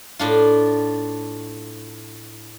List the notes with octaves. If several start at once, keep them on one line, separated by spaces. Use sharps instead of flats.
A2 D4 F4